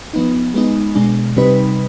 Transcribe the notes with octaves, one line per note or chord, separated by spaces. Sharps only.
F3 B3 D#4
G#3 B3 D#4
B2 G#3 D4
C3 G3 C4 D#4 B4